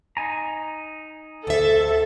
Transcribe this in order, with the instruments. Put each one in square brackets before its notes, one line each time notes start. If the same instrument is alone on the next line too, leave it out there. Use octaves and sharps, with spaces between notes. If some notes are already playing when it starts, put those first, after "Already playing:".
[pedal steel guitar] D#4 G#5 A#5
[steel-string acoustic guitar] D2 E5 [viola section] A4